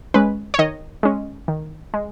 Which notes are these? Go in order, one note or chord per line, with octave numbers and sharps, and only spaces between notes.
G#3 C#4 B4
C#5
D#3 D#5
G#3 C#4
D#3
G#3